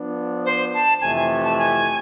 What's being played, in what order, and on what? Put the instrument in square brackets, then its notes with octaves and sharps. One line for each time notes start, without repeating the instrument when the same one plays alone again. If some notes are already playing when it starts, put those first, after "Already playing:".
Already playing: [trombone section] F3 B3 D4
[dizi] C5
A5
[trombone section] F2 C3 E3 A3 [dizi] G#5
[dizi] G#5
A5
G#5